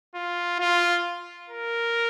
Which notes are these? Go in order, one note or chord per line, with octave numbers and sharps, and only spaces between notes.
F4
F4
A#4